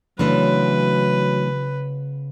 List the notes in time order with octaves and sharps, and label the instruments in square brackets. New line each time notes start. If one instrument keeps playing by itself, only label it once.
[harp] C#3 G#3 B3 [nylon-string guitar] E3 A3 D4 [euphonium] F#3 [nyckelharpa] B4